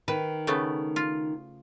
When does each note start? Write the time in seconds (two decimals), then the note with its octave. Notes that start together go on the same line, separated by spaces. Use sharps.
0.08 D#3 B4
0.47 C#3 A3 B3
0.96 F4